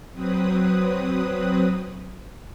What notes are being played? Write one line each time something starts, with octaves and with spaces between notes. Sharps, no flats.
F#3 C4 B4 D#6